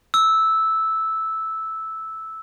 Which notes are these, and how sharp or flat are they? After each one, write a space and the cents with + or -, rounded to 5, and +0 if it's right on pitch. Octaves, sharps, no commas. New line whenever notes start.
E6 -10